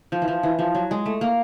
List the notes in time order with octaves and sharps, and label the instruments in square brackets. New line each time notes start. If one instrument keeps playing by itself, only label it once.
[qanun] F3
E3
F3
E3
F3
F#3
G#3
A3
A#3